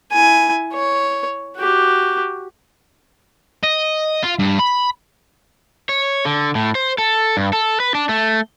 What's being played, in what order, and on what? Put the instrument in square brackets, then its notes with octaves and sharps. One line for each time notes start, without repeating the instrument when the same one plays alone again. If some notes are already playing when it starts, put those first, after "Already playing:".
[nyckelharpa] E4 G#5
C#5
F#4 G4
[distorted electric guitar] D#5
F4
G2
B5
[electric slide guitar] C#5
D3
A2
C5
A4
G2
A4
B4
D4
A3